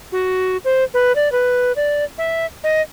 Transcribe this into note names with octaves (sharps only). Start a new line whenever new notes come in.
F#4
C5
B4
D5
B4
D5
E5
D#5